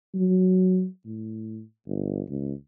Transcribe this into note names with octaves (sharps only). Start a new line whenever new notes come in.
F#3
A2
G1
C#2